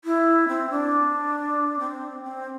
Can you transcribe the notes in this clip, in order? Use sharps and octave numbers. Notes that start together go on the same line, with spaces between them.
E4
C4
D4
C4
C4